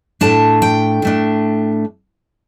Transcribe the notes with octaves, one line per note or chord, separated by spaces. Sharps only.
A2 A3 D4 A5
G5
A2 A3 D4